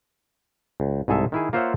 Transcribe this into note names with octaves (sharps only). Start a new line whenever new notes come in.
C#2
C2 G#2 G#4 A4 E5
D#3 E4 G#4
A#3 F4 C5 C#5 E5 F#5